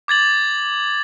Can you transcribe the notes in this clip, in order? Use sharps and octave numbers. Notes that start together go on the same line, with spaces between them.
D6 G#6 A6 F#7